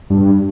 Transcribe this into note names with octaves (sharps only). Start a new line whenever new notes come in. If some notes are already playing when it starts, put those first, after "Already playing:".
G2